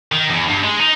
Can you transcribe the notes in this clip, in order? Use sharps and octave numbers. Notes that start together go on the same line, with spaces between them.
D#3
E2
G2
G#3
D#4